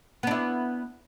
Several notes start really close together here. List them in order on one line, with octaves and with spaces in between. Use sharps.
B3 D4 E4